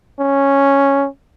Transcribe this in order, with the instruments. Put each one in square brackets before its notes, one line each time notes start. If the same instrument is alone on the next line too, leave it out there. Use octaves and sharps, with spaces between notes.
[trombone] C#4